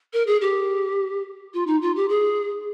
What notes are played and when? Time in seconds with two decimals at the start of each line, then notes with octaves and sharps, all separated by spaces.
0.13 A#4
0.27 G#4
0.41 G4
1.54 F4
1.67 D#4
1.82 F4
1.96 G4
2.09 G#4